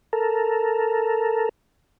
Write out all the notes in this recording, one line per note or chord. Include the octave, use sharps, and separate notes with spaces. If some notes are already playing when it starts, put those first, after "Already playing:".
A4 A#4